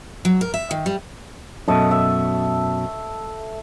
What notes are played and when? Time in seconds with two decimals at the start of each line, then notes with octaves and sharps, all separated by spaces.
0.25 F#3
0.41 A#4
0.54 E5
0.71 D#3
0.86 G3
1.68 F#2 B2 A3 A4 D#5
1.91 E5